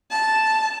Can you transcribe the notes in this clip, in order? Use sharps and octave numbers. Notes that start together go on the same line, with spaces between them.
A5